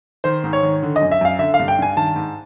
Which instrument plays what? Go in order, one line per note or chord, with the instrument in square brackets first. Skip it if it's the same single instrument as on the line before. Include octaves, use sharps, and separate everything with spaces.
[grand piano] D#3 C5
G#2
C#5
D#3
D3
D#5
F#2
E5
F#2 F5
D3 E5
F5
G2
G5
G2 G#5
D#3 A5
G#2